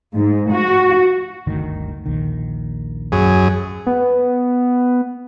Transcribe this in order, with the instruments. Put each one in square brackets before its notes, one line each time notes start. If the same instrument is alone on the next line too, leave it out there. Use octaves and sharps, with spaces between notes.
[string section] G#2
F#4
[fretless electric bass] G1 D2 D#3
A#1 D#2 D#3
[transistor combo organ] F#2 G#4
[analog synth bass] B3